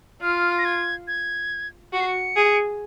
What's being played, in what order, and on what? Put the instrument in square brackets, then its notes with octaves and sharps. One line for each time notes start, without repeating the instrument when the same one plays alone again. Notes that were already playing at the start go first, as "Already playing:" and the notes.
[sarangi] F4 [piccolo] F6
[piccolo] A#6
G#6
G#6
[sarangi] F#4 [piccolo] C#7
[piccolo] C7
C#7
[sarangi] G#4